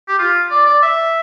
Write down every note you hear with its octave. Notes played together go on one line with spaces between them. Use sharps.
G4
F4
D5
D5
E5